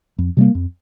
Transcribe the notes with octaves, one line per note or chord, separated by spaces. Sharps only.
F2
C3 G3 A#3
F2